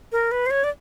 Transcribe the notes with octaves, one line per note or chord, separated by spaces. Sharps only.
A#4
B4
C5
C#5
D5